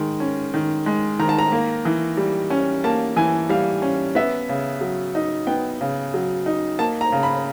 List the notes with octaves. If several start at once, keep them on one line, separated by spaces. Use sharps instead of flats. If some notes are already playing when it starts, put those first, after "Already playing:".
Already playing: D#3 G#3
C#4
D#3
G#3
D#3 A#5
A5
A#5
A#3
E3
G3
C#4
A#3 A5
E3 G#5
G3 F5
C#4
B3 E5
C#3
F#3
D#4
B3 G5
C#3
F#3
D#4
A#3 A5
A#5
C#3
B5